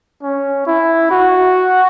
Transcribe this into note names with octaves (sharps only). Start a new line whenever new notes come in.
C#4
E4
F#4